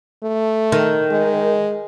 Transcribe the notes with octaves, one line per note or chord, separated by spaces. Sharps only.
A3
D#3
G#3